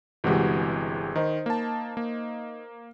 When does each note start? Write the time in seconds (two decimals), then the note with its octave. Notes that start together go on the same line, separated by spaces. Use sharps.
0.24 G1 C3 E3 G#3 F#4 G4
1.16 D#3 D#4 C5
1.46 A#3 A5
1.97 A#3